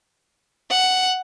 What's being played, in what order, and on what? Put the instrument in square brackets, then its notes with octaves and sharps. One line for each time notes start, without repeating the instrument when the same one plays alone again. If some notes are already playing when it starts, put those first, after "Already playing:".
[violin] F#5